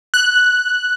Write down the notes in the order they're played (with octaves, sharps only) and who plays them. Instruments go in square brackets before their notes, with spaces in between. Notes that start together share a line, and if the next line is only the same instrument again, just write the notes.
[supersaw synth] F#6